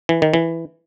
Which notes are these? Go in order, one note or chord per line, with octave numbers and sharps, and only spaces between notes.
E3
D#3
E3